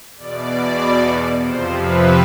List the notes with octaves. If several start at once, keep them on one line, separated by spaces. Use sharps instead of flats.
E2 B2 D5
F2 C3 F3 C5
B4